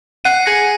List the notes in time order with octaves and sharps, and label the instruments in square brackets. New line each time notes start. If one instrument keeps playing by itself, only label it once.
[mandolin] F#5 [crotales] C7 D#7
[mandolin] G#4 [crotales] A#6 C#7